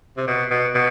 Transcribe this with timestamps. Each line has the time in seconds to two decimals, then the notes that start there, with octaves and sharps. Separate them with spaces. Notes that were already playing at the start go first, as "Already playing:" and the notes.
0.17 C3
0.27 B2
0.50 B2
0.74 B2